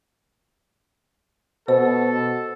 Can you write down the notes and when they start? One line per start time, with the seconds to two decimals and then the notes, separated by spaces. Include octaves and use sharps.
1.68 B2 A4 C5